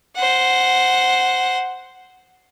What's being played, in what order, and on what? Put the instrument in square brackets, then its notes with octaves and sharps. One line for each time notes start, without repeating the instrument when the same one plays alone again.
[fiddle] C5 F#5